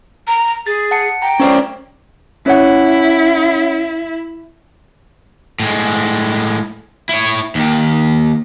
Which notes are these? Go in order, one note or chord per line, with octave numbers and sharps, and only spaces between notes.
A#5
G#4 A6
F#5 A5 C#7
G5 A#5
C#4 C5 D5
C#4 E4 C#5 F#5
A2 G#3
E4 C#5
D#2 D#3